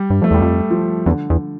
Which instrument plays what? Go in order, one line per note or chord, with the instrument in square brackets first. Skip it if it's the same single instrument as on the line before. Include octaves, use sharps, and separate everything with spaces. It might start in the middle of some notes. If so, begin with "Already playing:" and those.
Already playing: [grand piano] G3
[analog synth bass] G2
[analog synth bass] F2 [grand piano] A3
[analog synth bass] E2 [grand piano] G3
[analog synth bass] F2
[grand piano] F3
[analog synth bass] E2 [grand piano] D3
[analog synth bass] E2